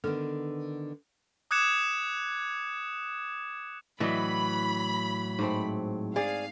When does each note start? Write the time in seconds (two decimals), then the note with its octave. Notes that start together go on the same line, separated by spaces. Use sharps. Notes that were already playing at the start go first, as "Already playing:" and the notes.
0.04 D3 D#3 B3 A4
1.51 D6 D#6 F#6 G#6 C#7 E7
4.00 A2 E3 F#3 B4 D5 D#5 B5
5.39 G#2 A3 C4
6.16 G#4 D5 F5